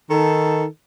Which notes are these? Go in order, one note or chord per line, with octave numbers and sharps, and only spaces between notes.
D#3 A4